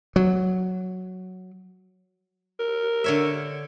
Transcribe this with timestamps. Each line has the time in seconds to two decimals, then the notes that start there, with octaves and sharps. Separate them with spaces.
0.16 F#3
2.60 A#4
3.04 D3 C#5 E5